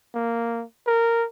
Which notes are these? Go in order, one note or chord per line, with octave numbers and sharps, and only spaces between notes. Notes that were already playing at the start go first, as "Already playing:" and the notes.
A#3
A#4